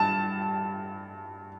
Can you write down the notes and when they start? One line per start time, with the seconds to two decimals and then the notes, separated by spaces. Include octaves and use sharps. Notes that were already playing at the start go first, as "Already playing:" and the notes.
Already playing: G2 A5